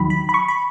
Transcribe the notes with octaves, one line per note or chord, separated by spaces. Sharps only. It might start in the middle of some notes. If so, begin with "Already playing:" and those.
Already playing: D#2 D#3 F#3 B5
B5
B5
C#6
B5